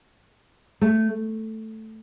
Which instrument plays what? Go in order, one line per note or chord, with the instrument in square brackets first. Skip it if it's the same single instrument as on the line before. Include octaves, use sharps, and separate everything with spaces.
[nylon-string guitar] A3